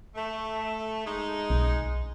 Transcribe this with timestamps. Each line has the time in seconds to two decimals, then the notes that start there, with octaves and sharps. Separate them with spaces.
0.16 A3
1.07 G#3 D#4
1.50 B1